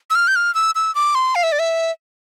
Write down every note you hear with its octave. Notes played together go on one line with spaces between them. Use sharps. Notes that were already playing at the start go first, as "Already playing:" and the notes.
E6
F6
G6
F6
E6
E6
D6
C6
F5
E5
D5
E5